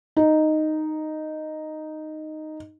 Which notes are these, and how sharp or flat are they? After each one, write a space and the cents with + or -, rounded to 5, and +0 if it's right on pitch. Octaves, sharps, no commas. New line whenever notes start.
D#4 -5